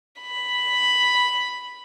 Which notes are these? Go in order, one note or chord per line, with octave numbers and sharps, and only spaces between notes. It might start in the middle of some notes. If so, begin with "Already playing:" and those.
B5